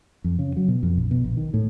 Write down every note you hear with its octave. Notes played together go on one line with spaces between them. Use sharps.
F2
C#3
F#3
B2
F2
A#1
B2
A#1
D#3
A2